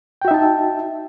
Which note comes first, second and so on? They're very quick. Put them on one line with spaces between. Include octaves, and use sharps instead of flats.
G5 F#4 E5 D#4 A5